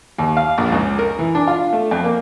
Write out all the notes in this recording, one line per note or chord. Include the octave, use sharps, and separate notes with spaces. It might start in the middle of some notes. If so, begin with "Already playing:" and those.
D#2
F5
A#1
C#2
A#4
E3
D4
F4
A3
F2
A#3